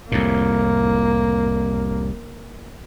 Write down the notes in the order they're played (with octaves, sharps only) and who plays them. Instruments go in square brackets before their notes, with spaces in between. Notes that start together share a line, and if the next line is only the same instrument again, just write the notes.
[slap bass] C2 F2 A2 [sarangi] A#3